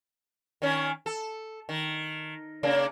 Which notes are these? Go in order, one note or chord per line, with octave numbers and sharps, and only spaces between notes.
D#3 C#4
A4
D#3
C#3 A#3 D4